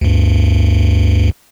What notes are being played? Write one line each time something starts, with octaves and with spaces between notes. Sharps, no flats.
D2 G2